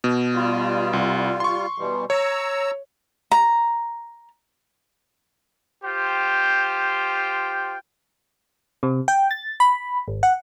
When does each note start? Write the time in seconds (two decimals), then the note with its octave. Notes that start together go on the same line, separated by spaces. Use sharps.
0.04 B2
0.34 G3 F4
0.93 C2
1.40 C6 C#6
1.78 B2 E3 G3
2.10 C#5 A#5 E6
3.32 A#5
5.84 F4 G4 C5 G5
8.83 C3
9.08 G5
9.31 A6
9.60 B5
10.08 G#1
10.23 F#5